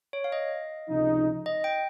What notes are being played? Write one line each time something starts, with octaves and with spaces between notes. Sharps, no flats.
C#5
F5
D#5
C#2 C3 F3 G#3 D#4
D#5
G5